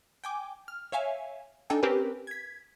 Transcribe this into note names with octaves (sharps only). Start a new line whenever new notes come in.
G5 G#5 D6
F6
C#5 E5 F5 G#5
D4 D#4 A4 G5 G#5
C4 C#4 G4 A#4 B4
G#6 B6